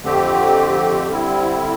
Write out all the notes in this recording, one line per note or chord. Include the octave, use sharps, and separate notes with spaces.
F2 D3 A3 C4 G4
D3 G3 C4 E4